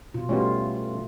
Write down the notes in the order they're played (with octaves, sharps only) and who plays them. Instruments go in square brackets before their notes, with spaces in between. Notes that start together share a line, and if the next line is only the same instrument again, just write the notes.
[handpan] B2 F4
[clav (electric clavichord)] B2 G3 C#4 [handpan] A3 F4